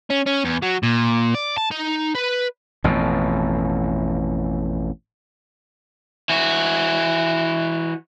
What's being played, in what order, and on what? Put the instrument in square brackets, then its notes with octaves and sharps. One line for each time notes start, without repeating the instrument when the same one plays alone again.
[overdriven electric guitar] C#4
C#4
E2
F#3
A#2
D5
A5
D#4
B4
[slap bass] A1 F2 B2
[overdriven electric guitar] E3 F#4